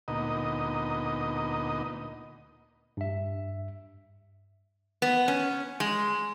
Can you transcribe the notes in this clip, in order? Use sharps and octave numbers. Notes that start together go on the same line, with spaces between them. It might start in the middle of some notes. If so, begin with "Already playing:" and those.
D2 A#2 B3 D#4 D#5
G2 E5
B3
C#4
G#3